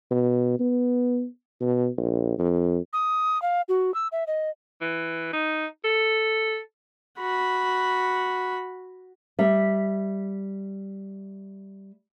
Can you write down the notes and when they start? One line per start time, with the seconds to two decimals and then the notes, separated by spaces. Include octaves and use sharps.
0.10 B2
0.59 B3
1.61 B2
1.97 A#1
2.39 F2
2.93 D#6
3.42 F5
3.68 F#4
3.94 E6
4.12 E5
4.27 D#5
4.81 E3
5.33 D#4
5.84 A4
7.19 F#4 B5
9.39 G3 E5